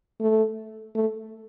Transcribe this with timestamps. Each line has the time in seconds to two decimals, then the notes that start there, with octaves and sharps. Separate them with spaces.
0.20 A3
0.95 A3